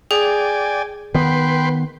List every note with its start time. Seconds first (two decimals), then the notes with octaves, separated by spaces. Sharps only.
0.11 G#4 D5 G5 G#5
1.15 D#3 B3 B4 G5 C6